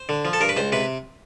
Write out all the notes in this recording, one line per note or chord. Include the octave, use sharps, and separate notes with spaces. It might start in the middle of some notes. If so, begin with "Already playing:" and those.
Already playing: C5
D3
F3
A4
G2 A#4
B4
C#2 C5
C3 B4